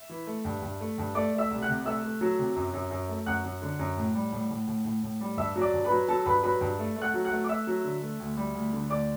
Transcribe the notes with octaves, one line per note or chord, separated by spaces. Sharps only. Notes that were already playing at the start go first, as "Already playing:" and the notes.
Already playing: E5
E3
A3
G2
G2
A3
G2
A3 D5 D6
A3
E5 E6
C2
F#5 F#6
C3
A3 E5 E6
A3
F#3
C3
F#2
F#2
F#2
A3
F#2 F#5 F#6
F#2
D3
F#2
A2
G3
A2
A2
A2
A2
A2
G3
G2 E5 E6
F#3
D5 D6
G2
B4 B5
F#3
F#3 A4 A5
G2 B4 B5
F#3 B4 B5
G2
A3
A3
F#5 F#6
F#3
F#5 F#6
A3
D6
A3 E5 E6
F#3
D3
A3
D2
G3
D2
D3
D2 D5 D6